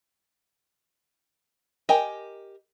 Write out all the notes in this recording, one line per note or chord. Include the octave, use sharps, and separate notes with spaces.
G4 A#4 D#5 G5 G#5